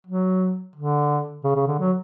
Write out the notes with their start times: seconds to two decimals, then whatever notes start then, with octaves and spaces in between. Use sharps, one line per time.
0.07 F#3
0.76 D3
1.44 C#3
1.55 C#3
1.67 D3
1.79 F#3